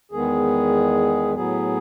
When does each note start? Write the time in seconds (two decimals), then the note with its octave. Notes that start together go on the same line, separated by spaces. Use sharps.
0.12 E2 D#3 G#3 B3 G#4
1.34 A2 F#3 B3 G#4